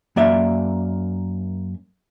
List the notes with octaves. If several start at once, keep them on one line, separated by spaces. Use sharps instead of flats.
F#2 A#3 D5 E5